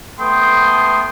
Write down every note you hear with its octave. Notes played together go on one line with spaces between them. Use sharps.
A3 B3 G5 C6 D#6